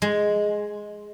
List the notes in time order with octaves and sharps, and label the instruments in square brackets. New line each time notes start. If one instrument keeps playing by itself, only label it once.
[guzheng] G#3